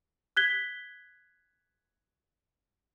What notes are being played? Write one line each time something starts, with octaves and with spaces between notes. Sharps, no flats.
F#6 G#6 B6 G7